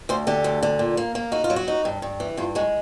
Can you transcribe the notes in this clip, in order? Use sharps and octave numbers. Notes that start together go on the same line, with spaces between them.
D2 C5
D3 G4
D2
D3
A#2
A#3
A#3
D#4 F#4
F4
F#3
F#4
D#4
G2
G2
E3
G2 F4
G#3 F#4